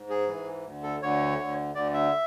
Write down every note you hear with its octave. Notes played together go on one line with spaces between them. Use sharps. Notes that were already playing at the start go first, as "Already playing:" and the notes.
Already playing: G#2
G#4
G#2 E3
D2 D3
A4
D2 D3 C#5
D2 D3
D2 D3 D5
E5